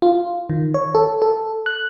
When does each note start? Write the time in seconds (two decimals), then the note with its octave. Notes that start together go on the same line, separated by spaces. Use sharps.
0.02 F4
0.50 D#3
0.74 C#5
0.95 A4
1.22 A4
1.66 F#6